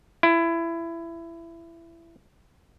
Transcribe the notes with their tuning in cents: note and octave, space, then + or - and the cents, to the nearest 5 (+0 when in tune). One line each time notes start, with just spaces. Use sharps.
E4 +20